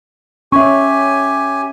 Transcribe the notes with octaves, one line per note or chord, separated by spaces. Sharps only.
C#4 G4 E5 G#5 C#6